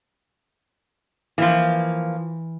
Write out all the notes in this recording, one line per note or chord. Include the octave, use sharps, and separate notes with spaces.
E3 F3 A#3